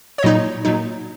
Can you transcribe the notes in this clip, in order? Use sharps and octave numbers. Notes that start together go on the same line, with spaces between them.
C#5
A#2 F#3 D#4 D#5
A#2 F#3 D#4